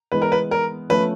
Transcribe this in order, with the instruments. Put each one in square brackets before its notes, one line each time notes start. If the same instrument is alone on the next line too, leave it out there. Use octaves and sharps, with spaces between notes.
[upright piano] E3 G#3 B3 [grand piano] B4
[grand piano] A#4
B4
A#4
[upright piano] F3 A3 C#4 [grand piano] B4